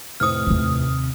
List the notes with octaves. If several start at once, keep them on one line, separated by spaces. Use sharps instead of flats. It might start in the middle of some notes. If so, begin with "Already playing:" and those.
F1 A2 C5 D#6 F6
D#2 C3